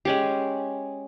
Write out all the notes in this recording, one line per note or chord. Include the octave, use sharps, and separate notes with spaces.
G#3 C#4 G4